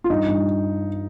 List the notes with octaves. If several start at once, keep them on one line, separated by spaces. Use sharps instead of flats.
F4
G2 D#4
G2